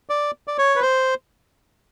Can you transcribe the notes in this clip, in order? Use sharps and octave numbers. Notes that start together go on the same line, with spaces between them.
D5
D5
C#5
B4
C5